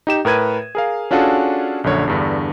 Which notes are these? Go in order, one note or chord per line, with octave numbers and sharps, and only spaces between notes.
D#4 G4 E7
A2 A#4 B4 G#6 D#7
G#4 A#4 F5
C#4 D4 F4 F#4 G#4 A4
A#1 F#2 D3 C#5
E2 G2 D3